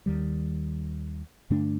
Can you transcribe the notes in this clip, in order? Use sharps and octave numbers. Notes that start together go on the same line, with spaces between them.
D#2 D#3 G3
G2 D3 A3 D4